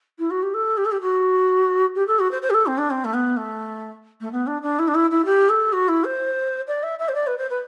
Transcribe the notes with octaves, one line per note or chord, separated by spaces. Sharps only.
E4
F#4
G4
A4
G4
A4
G4
F#4
G4
A4
F#4
C5
C5
G4
A4
C4
D4
C4
A3
B3
A3
A3
B3
D4
D4
E4
D4
E4
E4
G4
A4
F#4
E4
C5
D5
E5
E5
C5
D5
B4
C5
B4